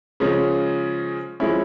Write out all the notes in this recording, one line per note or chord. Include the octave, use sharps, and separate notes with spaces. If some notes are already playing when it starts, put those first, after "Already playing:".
C#3 F3 G#3 C#4
F3 G#3 C#4 E4